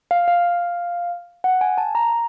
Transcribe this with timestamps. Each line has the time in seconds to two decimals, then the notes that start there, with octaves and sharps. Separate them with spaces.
0.11 F5
0.28 F5
1.44 F#5
1.61 G#5
1.78 A5
1.95 A#5